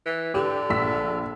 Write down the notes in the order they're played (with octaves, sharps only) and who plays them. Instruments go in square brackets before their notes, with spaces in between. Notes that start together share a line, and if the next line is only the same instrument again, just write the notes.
[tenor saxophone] E3
[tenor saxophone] D3 [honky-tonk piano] G4
[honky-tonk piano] A#1 E6 B6